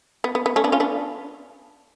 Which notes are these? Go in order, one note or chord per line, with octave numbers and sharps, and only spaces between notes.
B3
B3
B3
A3 C#4
B3 D4
C#4 F4
B3 D4